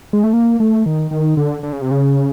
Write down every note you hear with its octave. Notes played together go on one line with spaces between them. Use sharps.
G#3
A3
A#3
A3
D#3
D#3
D3
D3
C#3
C3
C#3